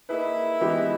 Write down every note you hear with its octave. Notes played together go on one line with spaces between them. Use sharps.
A#3 D#4 E4 G#4 B4
E3 G#3 B3 D#4 G4